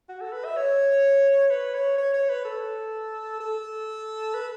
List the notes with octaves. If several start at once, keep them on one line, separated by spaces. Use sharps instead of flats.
F#4
A4
B4
E5
C#5
B4
C#5
C#5
C#5
B4
A4
A4
B4